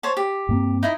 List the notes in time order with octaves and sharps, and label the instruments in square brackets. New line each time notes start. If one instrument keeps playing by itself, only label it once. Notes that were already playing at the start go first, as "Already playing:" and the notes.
[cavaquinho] C5 C#5 A5
G4
[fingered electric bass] G2 A#3 C4
[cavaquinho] D#4 E4 D#5